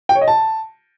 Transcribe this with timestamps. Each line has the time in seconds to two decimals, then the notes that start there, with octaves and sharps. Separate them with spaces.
0.09 G5
0.15 C#5
0.21 D#5
0.28 A5